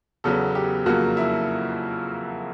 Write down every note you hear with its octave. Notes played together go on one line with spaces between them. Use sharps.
E2 C#3 F#3 B3 A4
G4
F2 C#3 F#3 A#3 F#4
E4